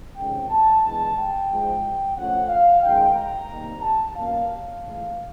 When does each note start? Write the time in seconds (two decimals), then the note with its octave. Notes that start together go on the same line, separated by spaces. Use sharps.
0.16 F2 C3 D#3 G#3 C#4 G5
0.50 A5
0.84 G2 E3 G#3 B3 A5
1.17 G5
1.50 G#2 F3 G#3
2.16 A2 F3 A3 C#4 F#5
2.49 F5
2.82 F#2 D#3 G#3 G5
3.15 A#5
3.49 C3 D#3 G3 A#3
3.82 A5
4.15 B2 G3 A#3 C#4 F5
4.49 F5
4.82 A2 E3 G#3